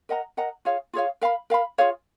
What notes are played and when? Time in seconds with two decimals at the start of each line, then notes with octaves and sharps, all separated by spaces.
0.09 A#4 D#5 F#5 A#5
0.37 A#4 D#5 F#5 A#5
0.65 F4 G#4 C#5 F5
0.93 F4 G#4 C#5 F5
1.21 A#4 F5 B5
1.50 A#4 F5 B5
1.78 F4 G#4 C#5 F5